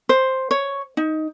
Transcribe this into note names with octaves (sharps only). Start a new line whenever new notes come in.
C5
C#5
D#4